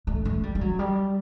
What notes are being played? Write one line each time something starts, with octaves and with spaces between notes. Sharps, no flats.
A3
A3
G3
G3
F#3
G3